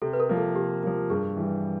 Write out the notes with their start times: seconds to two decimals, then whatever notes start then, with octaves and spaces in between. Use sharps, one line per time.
0.02 C3 A4
0.13 B4
0.20 A#4
0.29 F3 A#3
0.38 A4
0.55 C3 G4
0.83 F3 A#3
1.10 G2 G#4
1.37 E3 G3